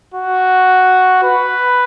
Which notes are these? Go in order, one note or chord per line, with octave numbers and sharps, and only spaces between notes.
F#4
B4